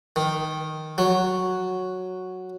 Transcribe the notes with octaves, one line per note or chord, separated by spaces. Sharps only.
D#3
F#3